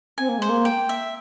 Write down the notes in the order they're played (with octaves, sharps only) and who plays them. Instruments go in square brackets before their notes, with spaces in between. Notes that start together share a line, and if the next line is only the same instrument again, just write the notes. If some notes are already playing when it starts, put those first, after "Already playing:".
[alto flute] C4 [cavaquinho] G#5
[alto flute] A#3
[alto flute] G#3 [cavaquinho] C5
[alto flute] A#3
[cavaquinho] G5
E5